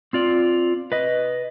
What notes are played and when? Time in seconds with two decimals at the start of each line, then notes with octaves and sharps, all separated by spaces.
0.13 C4 F4 D5
0.92 B4 D#5